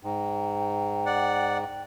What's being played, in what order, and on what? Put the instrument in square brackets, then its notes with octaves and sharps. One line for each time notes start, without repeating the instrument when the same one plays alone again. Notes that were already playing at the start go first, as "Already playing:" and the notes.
[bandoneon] G#2 [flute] G5
[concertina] D5 F#5